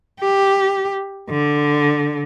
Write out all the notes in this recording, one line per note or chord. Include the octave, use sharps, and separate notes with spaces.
G4
D3